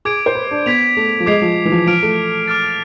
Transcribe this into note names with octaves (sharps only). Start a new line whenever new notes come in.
G#4 D6 G#6 D7
C5
B4
D4
B3 G#6 B6 D7 F7
A3
F3
G#3 D6 G#6 C7 F7
F3
E3
F3
F3 F6 B6 D7 F7
A3
D6 F6 A6